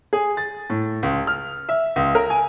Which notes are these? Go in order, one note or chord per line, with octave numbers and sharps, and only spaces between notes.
G#4
A6
A2
C#2
F6
E5
C#2
A#4
G#5